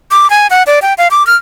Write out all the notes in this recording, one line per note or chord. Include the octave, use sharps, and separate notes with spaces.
D6
G#5
F#5
D5
G5
F5
D6
F6